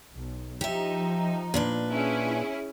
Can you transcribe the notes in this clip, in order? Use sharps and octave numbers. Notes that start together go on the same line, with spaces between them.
B1
F3 D#4 G4 E5
A#2 D4 B4
C#4 E4 G#4